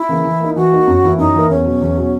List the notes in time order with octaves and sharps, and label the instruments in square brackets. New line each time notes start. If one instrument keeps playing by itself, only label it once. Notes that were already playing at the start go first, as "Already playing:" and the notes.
Already playing: [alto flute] E4
[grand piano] C#3 E3 A#3
E3
A#3 D#4
[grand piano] E3 [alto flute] F#4
[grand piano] A#3 D#4
F#2
E3 A#3 E4 A#4
[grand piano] F#2 [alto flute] D#4
[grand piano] E3 A#3 E4 A#4
[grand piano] E2 [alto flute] C#4
[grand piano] B2 F#3
E2
B2 F#3